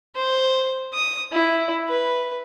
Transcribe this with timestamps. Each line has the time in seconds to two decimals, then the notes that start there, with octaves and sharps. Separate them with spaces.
0.16 C5
0.94 D#6
1.32 E4
1.89 B4